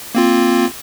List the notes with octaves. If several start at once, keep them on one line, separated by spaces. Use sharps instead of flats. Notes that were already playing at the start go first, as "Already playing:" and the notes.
A#3 C4 F4